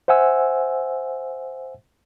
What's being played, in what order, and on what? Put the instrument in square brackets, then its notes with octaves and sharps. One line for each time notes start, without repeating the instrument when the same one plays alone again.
[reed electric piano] C5 E5 F#5 G#5 E6